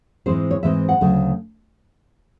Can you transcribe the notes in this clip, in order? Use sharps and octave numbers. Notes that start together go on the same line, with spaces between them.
G#2 E3 G#3 C4 C5
C#5
G#2 E3 G#3 C4 E5
F#5
D2 C#3 F#3 A3